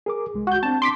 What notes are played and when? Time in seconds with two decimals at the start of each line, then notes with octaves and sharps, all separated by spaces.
0.06 G#4 A#4 D6
0.34 C2 G#3
0.47 F#4 G6
0.63 C4 D4 A5
0.82 C6 D6 B6